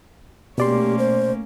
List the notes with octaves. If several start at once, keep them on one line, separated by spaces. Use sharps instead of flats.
B2 A3 A#3 C#4 G4 D5 C6
C5